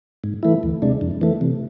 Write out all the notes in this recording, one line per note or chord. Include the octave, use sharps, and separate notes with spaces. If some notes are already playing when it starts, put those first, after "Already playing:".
G#2
E3 A3 E4
D2
C3 G#3 D4
F2
E3 A3
C3